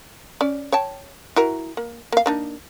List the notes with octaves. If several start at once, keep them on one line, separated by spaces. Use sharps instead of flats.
C#4 D5
C#5 G5 A5
E4 F#4 A#4
A#3
A#3 F5
A#3 D4 D#4